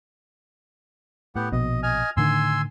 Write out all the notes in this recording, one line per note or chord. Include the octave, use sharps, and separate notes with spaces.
A2 B3 G4 F#5
A#1 B2 D#5
D#5 G#5 F6
A2 D3 D#3 G#5 C6 E6